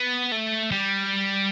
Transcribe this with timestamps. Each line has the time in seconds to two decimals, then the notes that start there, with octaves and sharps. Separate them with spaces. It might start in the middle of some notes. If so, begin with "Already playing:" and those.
Already playing: B3
0.32 A3
0.71 G3